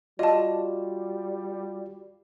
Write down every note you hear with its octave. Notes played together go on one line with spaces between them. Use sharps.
G3 F4 F#4 D5 D#5 A5